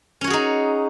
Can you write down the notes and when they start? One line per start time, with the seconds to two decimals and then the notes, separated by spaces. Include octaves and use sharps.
0.21 C#4
0.24 C#5
0.27 F#4
0.30 G#4
0.33 D#4